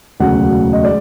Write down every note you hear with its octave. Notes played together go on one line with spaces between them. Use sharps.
E1 D2 C#3 F#3 F#5
D#5
G#3 D5